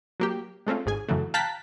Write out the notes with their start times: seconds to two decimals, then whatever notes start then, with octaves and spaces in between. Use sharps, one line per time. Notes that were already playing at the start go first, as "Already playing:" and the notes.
0.20 F#3 A#3 G4
0.67 G#3 A3 C4 C#4 F4
0.86 G#1 G#2 G#4 G#5
1.08 F#2 A2 C#3 E3 F#3 A3
1.34 F5 G5 A5 A#5 F#6 B6